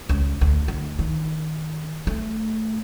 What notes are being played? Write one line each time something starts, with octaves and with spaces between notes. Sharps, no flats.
C#2
D2
D2
D#3
A3